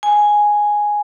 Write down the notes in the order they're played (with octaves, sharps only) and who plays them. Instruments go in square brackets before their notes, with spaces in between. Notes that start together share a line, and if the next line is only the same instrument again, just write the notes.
[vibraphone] G#5